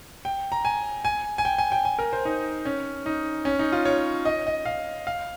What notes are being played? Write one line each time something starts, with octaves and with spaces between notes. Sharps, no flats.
G5
A#5
G#5
G#5
G#5
G5
G#5
G5
G#5
A#4
C5
D#4
C#4
D#4
C#4
D#4
F4
C#5
D#5
D#5
F5
F5